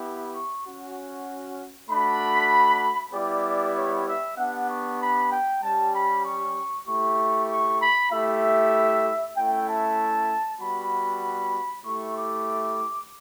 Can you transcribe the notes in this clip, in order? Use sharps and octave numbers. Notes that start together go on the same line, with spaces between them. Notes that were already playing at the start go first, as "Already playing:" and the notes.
Already playing: B3 E4 G4
C#6
C#4 F#4
A3 D4 F#4 B5
G3 B3 E4 G4 D5
C#5
E5
B3 D4 G4 F#5
C#6
B5
G5
G3 C#4 G4 A5
B5
C#6
A3 E4 G4 C#6
C#6
B5
A3 E4 G4 E5
A3 C#4 E4 G5
A5
G3 B3 F#4 B5
A3 E4 G4 C#6
D6